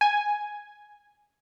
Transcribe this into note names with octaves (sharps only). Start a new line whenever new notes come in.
G#5